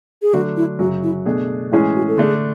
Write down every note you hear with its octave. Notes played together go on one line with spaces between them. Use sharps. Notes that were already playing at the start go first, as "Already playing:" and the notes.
G#4
D3 F#3 A3 D4 F#4
E4
F#2 C#3 F#3 F#4
E4
B2 A3 D4 G#4
A2 E3 G#3 C#4 E4 G#4
F#4
A4
D3 A3 D4 G#4